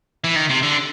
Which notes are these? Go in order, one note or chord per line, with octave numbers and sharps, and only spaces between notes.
E3
D#3
C3
D3